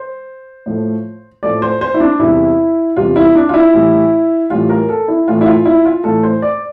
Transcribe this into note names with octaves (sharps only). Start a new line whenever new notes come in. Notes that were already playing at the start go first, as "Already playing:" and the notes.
Already playing: C5
A2 F3 A3
A2 F3 A3 D5
C5
C5
E4
D4
E2 C3 G3 E4
E2 C3 G3 F4
E4
D4
F4
E4
A2 E3 G3
A2 E3 G3 F4
A#4
A4
E4
A2 E3 A3 F4
E4
F4
E4
F4
A2 E3 A3 A4
C5
D5